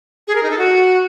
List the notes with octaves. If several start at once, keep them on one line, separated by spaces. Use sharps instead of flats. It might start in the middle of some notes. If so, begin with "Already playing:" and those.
G#4
A#4
D#4
A4
F#4